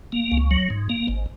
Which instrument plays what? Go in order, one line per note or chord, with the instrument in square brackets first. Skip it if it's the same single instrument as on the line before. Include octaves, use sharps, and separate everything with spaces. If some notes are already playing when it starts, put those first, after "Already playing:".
[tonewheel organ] A#3
C#2
F#3
G#2
A#3
G#1